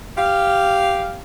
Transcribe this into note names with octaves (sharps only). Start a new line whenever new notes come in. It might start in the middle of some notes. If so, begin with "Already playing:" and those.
G4 F5